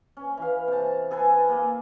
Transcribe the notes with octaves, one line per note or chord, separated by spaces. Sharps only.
C#4
E3 F5
C3 A5
G#4 A4 B4 G#5
A#3 G#4